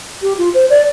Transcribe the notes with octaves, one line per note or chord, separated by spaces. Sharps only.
G4
F4
C5
D5